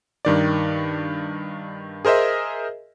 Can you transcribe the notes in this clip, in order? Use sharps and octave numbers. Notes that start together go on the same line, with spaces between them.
G2 D#3 D5
G#4 A#4 C5 D#5 E5